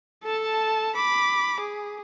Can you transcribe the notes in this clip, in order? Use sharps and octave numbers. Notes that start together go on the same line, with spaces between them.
A4 A5
B5 D6
G#4